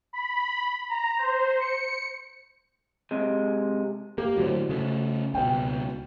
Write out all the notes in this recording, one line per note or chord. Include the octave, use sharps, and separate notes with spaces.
B5
A#5
C5
C#7
C3 G#3
A#3 G4
A2 D3 F#3 F#4 C5
C#3 A3
C#2 B2 G5